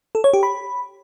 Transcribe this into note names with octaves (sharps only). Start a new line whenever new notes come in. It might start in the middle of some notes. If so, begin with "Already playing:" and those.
A4
C#5
G4
B5